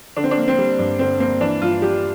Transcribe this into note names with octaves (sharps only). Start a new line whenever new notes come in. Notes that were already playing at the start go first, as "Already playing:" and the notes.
D3 D4
C4
D4
A#3
C4
G3
G2
D3 C4
A#3 C4
E3 D4
G2 F4
G3 G4